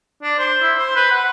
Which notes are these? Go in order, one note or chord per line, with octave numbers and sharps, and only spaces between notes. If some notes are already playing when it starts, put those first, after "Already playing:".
D4
C5
E4
C5
B4
F#5